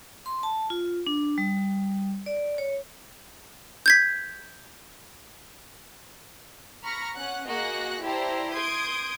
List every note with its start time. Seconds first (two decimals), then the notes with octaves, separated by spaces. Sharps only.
0.26 C6
0.43 A5
0.70 F4
1.07 D4
1.38 G3
2.26 D5
2.58 C#5
3.86 G6 G#6 B6
6.83 A#5 B5 C#6 F6 A#6
7.16 C#4 F#5 F#6
7.47 A#3 F#4 G#4 D#5 F#6 A#6
8.03 E4 G4 C5 D5 A5 A#5
8.53 C6 D#6 G6 G#6 D7